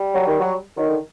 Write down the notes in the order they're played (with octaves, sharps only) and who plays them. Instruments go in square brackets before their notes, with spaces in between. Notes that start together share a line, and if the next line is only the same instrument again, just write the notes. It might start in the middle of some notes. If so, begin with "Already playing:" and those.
Already playing: [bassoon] G3
[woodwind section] F#3
D#3
F#3
[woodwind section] D#3 [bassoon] F#3
[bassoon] D3